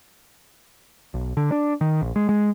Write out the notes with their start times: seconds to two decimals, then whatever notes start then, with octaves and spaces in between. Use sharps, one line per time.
1.14 B1
1.37 D3
1.52 D4
1.81 D#3
2.02 A#1
2.16 G#3
2.29 G#3